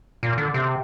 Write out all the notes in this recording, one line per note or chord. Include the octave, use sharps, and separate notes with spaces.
A#2
D3
C3